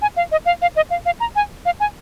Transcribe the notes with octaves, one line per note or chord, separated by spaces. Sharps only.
G#5
F5
D#5
F5
F5
D#5
F5
F5
A#5
G#5
F5
G#5